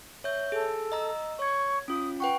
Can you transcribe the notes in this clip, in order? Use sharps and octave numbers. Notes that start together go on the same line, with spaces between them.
C#5 E5 G6
G#4 A4
D#5 A#5 E6
C#5 C#6 G#6
C#4 F4 D#6
B4 F#5 G5 C#6